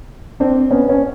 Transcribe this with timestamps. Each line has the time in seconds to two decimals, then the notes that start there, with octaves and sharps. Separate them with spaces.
0.40 C4 D4
0.71 B3 C#4
0.89 C#4